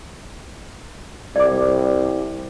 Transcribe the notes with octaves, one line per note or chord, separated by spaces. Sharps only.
C2 D5 D6